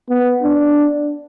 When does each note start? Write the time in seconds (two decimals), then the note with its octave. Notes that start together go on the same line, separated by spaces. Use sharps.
0.09 B3
0.43 D4